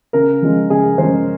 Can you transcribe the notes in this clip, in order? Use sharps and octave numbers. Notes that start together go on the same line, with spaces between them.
C#3 A#4
F3 G#3 C#4
C#3 G#4
F3 G#3 C#4 C5